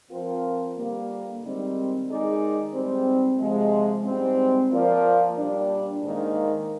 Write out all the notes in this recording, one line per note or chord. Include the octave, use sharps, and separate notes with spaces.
F3 C4 F4 A#4
D3 G3 A#3
G#2 D#3 G3 C4
D#3 G#3 D#4 G#4 D5
G#2 G3 C4
C3 F3 G#3
G#2 G3 C4
F3 A#3 F4 A#4 D5
A#2 G3 D4
G#2 D#3 A#3